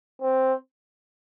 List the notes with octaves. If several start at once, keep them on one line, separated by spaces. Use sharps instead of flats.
C4